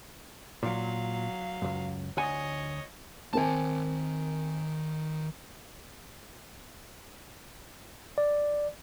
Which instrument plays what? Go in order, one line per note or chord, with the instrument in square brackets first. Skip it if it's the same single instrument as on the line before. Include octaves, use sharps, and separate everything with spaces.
[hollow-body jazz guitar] A#2 [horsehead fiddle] F#3 F5
[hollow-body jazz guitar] C#2 F#2
[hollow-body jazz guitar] D2 F#5 G#5 [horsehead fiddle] C#5 D#5
[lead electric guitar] D#3 A5 [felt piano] C4 A#4 G#5
[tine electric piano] D5